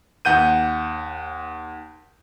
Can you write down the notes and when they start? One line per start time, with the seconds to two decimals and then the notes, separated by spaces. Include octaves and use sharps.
0.25 D#2 F#5 G6 D#7